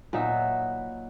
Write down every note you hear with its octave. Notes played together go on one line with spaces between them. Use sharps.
A#2 F#3 B3 D#4 E5